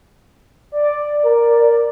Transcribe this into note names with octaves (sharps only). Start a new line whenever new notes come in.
D5
A#4